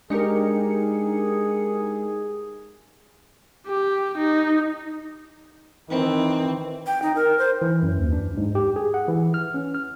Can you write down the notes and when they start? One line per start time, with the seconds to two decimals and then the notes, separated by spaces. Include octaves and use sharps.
0.10 G#3 D4 D#4 G4 G#4 A#4 C#7
3.67 G4
4.18 D#4
5.90 D#3 E3 C4
6.87 G5
7.02 D#4
7.16 A#4
7.39 C5
7.62 E3
7.83 F#2
7.98 D#2
8.13 D4
8.37 G#2
8.55 G4
8.76 G#4
8.94 F#5
9.08 E3
9.34 F6
9.54 C#4
9.75 F6